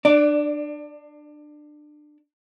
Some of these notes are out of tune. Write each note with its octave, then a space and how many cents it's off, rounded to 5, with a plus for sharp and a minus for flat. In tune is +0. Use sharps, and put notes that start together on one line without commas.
D4 +25 D5 +0